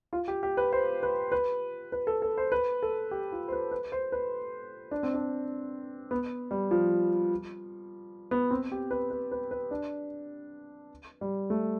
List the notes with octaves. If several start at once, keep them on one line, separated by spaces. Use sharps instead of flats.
F4
G4
G4
B4
C5
B4
B4
B4
A4
A4
C5
B4
A4
G4
F4
C5
B4
B4
C5
B4
D4
C4
D4
B3
G3
F3
B3
C4
G4
B4
B4
B4
B4
D4
G3
A3